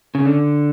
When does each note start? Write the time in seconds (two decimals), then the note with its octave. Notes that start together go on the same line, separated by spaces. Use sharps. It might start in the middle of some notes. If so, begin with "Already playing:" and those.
0.15 C#3
0.25 D3